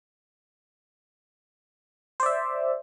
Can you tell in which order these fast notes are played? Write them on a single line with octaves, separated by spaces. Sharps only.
C5 D5 E5